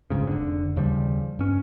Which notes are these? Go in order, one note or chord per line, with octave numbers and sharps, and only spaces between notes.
G1 C#2 G#2 C#3
F1 D3
D#2 C#3 F3 G3
G2 C#4